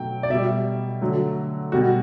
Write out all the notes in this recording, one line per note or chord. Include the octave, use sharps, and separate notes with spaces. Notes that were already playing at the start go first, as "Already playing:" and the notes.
Already playing: B2 F#3 A3 G5
D5
B2 G3 E5
D3 F#3 A3
B2 G3 F#4